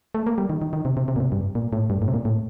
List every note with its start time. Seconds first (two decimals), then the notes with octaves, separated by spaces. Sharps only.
0.15 A3
0.27 A#3
0.38 G3
0.50 D#3
0.62 D#3
0.73 D#3
0.85 C3
0.97 C3
1.08 C3
1.16 A#2
1.20 C3
1.32 G2
1.55 A#2
1.73 A2
1.90 G2
2.02 A2
2.08 C3
2.14 A#2
2.25 A2